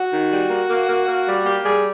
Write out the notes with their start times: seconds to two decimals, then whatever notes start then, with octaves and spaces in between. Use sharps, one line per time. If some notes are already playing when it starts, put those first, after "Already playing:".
Already playing: F#4
0.12 D#3
0.31 G3
0.50 A#3
0.69 A#3
0.88 A#3
1.07 A#3
1.26 G3
1.45 A#3 G4
1.64 G3 G#4